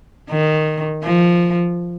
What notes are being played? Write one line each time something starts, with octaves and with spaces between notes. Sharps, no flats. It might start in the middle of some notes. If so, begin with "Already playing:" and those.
D#3
F3